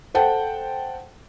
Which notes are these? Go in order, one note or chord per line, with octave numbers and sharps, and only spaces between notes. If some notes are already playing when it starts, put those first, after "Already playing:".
A4 C5 F#5 G5 A5